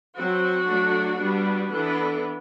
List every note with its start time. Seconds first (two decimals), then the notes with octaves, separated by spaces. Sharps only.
0.15 F#3 C4 F#4
0.67 F#3 A3 D4
1.19 G3 B3 D4
1.71 E3 B3 D4 A4